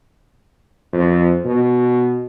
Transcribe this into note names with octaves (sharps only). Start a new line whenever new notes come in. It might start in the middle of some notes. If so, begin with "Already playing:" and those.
F2
B2